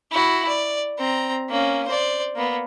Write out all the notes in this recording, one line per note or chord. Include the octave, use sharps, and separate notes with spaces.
E4 F#4
D5
C4 A#5
A#3 C#4
C5 D5
A#3 B3